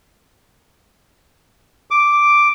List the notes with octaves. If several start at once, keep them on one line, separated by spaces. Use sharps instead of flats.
D6